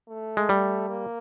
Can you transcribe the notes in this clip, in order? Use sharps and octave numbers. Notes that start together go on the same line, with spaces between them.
A3
G#3
G3
A#3